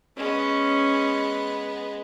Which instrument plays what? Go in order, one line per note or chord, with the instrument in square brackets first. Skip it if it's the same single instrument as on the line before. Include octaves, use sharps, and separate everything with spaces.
[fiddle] G#3 B3 [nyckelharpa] C#4